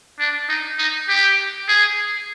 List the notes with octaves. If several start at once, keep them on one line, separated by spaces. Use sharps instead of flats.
D4
D#4
D#4
G4
G#4